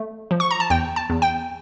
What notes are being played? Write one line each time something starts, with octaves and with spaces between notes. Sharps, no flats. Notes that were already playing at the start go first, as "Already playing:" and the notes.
Already playing: A3
F3
C#6
A#5
A5
E2 G5
A5
E2
G5